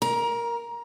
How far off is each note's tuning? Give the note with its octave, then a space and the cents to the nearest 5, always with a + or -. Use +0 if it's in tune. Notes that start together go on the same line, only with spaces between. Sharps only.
A#4 +0 A#5 +25